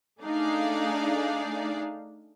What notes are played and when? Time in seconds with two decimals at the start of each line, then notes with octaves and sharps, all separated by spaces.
0.21 A3 D4 D#4 G#4 D5 F5